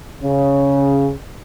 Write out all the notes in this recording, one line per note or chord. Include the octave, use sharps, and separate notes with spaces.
C#3